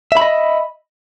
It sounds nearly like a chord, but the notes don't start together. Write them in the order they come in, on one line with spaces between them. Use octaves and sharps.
E5 B5 D#5